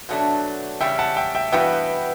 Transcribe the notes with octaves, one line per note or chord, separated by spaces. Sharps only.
B2 F#3 A3 D4
E2 C#3 G3 C#4 E5 G5
F#5 A5
E5 G5
E5 G5
G2 E3 B3 F#4 B4 E5 G5